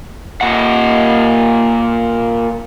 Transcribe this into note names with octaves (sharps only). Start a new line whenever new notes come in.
A#2 F#5